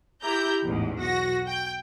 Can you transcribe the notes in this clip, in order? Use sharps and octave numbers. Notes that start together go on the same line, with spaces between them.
E4 G4 A#5 G6
A1 E2 G#2
B1 F#4 A#6
G5